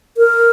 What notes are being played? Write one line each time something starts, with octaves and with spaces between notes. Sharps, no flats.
A#4